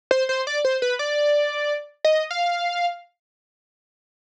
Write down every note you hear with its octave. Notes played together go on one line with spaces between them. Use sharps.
C5
C5
D5
C5
B4
D5
D#5
F5